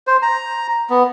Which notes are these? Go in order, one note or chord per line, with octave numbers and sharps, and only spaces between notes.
C5
A#5
B3